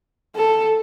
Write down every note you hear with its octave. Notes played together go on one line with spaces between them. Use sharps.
A4